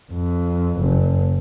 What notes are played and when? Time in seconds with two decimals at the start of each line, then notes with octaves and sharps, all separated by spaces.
0.12 F2
0.80 F#1